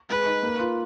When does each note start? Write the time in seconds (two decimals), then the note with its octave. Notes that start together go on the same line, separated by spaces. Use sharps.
0.09 G#3 B4
0.26 D#4
0.43 A#3
0.59 F4